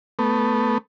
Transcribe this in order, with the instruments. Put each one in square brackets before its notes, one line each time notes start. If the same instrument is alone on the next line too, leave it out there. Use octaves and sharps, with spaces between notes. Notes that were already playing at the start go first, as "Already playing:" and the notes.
[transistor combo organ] A3 B3